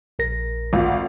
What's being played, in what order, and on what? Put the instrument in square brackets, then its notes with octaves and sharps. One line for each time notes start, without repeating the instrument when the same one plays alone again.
[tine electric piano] A#1 A#4 A#6
[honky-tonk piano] G#1 D2 F4